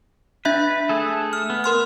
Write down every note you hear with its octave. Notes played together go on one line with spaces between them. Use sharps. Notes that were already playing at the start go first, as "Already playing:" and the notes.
D4 B4 E5 G6
A3 G#4 A4
F6
B3
A#4 C6 F6